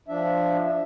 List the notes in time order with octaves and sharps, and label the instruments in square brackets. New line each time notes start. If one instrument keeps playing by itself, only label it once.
[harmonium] F3 D4 E5